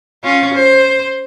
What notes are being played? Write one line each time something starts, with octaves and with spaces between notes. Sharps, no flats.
C#4 F4
C5